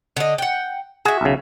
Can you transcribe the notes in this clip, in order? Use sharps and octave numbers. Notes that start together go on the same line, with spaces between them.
D3 D#5
F#5 G5
F#4 G#4 E5
B1 C#3